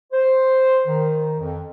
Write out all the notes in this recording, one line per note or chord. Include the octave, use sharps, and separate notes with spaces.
C5
D#3
F2